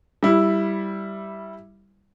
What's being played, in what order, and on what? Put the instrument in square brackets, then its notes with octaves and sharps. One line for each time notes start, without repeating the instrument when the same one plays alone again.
[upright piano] G3 E4